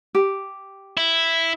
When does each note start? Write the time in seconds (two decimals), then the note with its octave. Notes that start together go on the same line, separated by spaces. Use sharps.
0.15 G4
0.97 E4